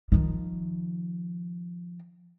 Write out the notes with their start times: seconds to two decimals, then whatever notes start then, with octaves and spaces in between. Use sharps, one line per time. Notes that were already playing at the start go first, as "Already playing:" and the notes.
0.12 D#3 F3